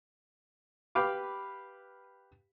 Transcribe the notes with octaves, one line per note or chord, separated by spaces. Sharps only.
G4 B4 F5 D6